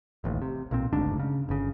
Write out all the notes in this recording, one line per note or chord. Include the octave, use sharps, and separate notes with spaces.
D1 A1 D#2
C3
B1 A#2 C4
F#1 D2 G#2 D4
C#3
G1 C#3